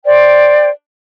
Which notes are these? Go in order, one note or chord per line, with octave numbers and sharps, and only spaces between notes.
C5 D5 G5